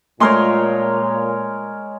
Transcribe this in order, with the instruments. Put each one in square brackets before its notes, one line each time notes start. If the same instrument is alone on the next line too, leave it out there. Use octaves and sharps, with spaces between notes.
[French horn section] A#2 [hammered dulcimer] G#3 A#4 C#5 [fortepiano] A3 C6